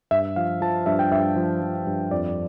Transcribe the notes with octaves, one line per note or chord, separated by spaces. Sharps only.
G2 E5
F3 F5
F3 A5
G2 E5
G5
G2 E5
F3
F3
G2
F2 D5